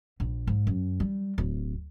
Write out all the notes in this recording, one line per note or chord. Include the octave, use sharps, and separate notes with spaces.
A#1
G#2
F#2
G3
D1